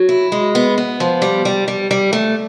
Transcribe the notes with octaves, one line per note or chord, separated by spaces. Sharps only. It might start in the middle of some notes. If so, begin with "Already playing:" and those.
Already playing: F#3
E4
G#3
B3
B3
F3
G3
G3
G3
G3
A3